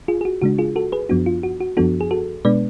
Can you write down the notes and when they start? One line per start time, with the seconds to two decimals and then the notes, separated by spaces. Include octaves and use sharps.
0.08 F4 G#4
0.21 G#4
0.25 F#4
0.42 C#3 G#3 D4 F#4
0.58 F4 G#4
0.76 F#4 A4
0.92 G#4 B4
1.09 F#2 F3 B3 D4 F#4
1.26 F4
1.43 F#4
1.60 F#4
1.77 F#2 F3 B3 D4 F#4 A4
2.01 G#4
2.11 F#4 A4
2.45 B2 G#3 B3 D4 B4 D5